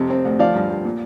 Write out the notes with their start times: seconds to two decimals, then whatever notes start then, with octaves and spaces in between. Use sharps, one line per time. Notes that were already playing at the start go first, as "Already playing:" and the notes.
Already playing: F2 C3
0.10 C4
0.25 D2
0.39 F3 D5 F5
0.55 G2
0.70 G2
0.85 A#2